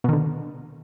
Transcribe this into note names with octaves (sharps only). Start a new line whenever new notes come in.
B2 D3 D#3